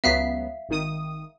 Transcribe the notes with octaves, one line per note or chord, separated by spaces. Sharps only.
C#2 F#3 B3 E5 F5 B6
G#1 D#3 D#6